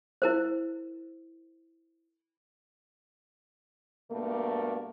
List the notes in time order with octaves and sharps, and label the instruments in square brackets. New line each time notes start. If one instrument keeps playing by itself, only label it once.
[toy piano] E4 A#4 C5
[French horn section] G2 B2 A3 A#3